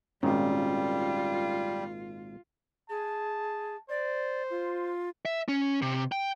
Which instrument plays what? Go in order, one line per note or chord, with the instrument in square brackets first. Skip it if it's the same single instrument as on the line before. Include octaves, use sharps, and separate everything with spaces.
[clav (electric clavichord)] G#1 A#2 D#3 [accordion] G3 [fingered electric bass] C#4 [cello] F4
[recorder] G#4 [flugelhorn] A5
[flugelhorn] C5 [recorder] D5
[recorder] F4
[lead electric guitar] E5
C#4
C3
G5